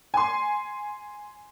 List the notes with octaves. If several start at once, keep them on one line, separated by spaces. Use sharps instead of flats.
G#5 C6